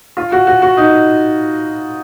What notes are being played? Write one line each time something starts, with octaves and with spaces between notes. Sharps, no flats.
F4
F#4
F#4
F#4
D#4